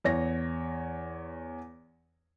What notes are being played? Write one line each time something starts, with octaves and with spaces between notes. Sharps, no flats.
E2 C#5 A#6